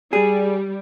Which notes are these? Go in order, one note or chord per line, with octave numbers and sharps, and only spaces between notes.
G3 G#4